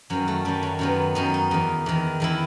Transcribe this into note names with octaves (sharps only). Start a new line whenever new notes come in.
F#2 D#3 F#3
A3
F#2 D#3 G3
F#3
F#2 D#3 B3
F#2 D#3 D#4
D#4
E2 D#3
E2 D#3
E2 D#3 E4